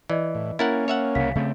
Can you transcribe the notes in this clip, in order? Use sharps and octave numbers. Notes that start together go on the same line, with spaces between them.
E3 D5 D#5
A2
A#3 C#4 E4 A#4 F#5 A6
C#5 E5 F#5
C2 C#3 F5 B6
C#3 A3 C4